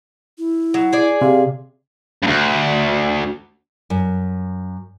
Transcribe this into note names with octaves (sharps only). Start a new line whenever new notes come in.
E4
F#3
G#4 D5
C3 F5
D2 G2
F#2